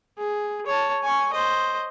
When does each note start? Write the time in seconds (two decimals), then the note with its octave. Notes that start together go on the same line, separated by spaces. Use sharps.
0.18 G#4
0.66 C#5 A5
1.03 G#5 C#6
1.33 C5 D#5